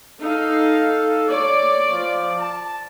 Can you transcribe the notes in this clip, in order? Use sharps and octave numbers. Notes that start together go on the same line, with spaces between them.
D#4 A4 F5
C#5 D5
F3
A5